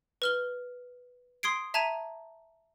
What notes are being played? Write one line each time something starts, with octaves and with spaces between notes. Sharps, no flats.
B4 F6 G7
C6 D#6 G#6 C7 D7
E5 A5 A#5 G#6 D#7